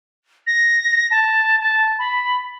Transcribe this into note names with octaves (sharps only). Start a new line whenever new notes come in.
A#6
A5
A5
B5